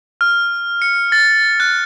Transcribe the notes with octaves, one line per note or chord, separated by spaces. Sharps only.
F6
C#7
A6
F#6